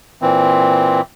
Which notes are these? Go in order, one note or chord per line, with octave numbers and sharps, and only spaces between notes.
A#2 E3 C4